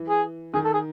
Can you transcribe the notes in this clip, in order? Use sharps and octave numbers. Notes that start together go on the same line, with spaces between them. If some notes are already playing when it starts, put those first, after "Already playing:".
Already playing: E3
G#4
D#3 G#4
A4
G#4